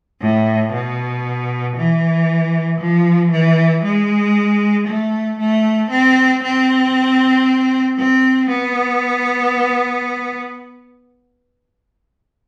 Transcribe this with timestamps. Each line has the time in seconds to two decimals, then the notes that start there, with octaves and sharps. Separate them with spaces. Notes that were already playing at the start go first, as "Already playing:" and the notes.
0.21 A2
0.73 B2
1.76 E3
2.80 F3
3.32 E3
3.84 G#3
4.87 A3
5.39 A3
5.91 C4
6.43 C4
7.99 C4
8.50 B3